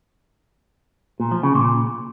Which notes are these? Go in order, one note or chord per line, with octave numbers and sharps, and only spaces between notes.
A#2
F3
C#3
A#2